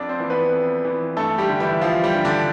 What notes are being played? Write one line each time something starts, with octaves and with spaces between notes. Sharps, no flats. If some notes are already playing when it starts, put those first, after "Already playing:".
Already playing: F2 D4 D5
C4 C5
E3
B3 B4
F2
E3
G2 A3 A4
G3 G4
D3
E3 E4
F3 F4
G3 G4
G2
D3 D4